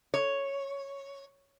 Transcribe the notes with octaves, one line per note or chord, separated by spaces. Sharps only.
C#5